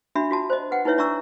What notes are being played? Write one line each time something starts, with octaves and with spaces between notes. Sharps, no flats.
D4 F#4 E5 B5
F4 F#4 A5
C5 D5 D#5
B4 F#5 G5
D#4 E4 B4 C#5 E5
D4 D5 E5 A#5 C#6 E6